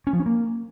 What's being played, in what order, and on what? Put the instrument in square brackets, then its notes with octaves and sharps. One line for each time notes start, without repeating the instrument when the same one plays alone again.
[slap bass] C#4
F3
C#4
A#3